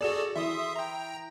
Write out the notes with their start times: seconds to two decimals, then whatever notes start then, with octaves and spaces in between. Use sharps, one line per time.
0.01 F#4 G#4 A4 D5 E7
0.36 E3 E5 C6 D#6
0.76 G5 A#5